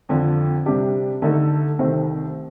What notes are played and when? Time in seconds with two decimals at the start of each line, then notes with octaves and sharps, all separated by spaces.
0.09 F2 D3 F3
0.66 C3 G3 D4 G4
1.22 D3 A3 D#4 A4
1.79 C2 C3 D#3 A3 C4